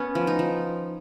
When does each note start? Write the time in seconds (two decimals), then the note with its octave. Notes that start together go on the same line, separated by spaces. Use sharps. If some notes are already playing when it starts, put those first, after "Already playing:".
Already playing: B3 C#4
0.15 F3
0.27 D#4
0.39 F3